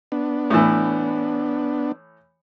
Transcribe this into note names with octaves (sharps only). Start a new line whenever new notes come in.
B3 D4
A2 E3